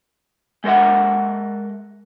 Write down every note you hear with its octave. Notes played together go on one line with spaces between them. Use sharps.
G#3 A4 A#4 E5 F#5